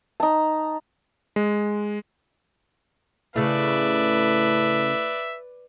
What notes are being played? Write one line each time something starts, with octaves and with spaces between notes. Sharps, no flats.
D#4 A5
G#3
A2 C#3 A3 B4 D5 E5